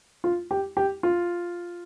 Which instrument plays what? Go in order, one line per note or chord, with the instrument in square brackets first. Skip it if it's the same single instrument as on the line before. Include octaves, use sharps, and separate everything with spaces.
[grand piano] F4
G4
G4
F4